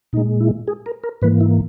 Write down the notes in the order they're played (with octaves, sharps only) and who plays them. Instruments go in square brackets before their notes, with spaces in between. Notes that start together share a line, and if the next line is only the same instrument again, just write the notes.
[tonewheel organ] A#2 D#4
G#3
E4
G#4
A#4
A#4
G#2 E3 A#3 B4
E4